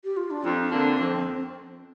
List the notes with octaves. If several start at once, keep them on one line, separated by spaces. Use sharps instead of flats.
G4
F4
D4
F2 C4
D3 A#3 D4
F2